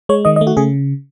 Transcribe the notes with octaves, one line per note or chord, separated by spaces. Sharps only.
G#3 C#5
D#3 D#5
D#5
A3
F#4
C#3 G#4